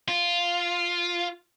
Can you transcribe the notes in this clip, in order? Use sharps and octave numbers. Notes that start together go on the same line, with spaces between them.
F4